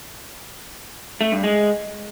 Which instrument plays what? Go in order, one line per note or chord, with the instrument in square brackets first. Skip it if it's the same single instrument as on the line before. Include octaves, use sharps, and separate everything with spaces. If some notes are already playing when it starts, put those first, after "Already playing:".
[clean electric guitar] A3
G2
G#3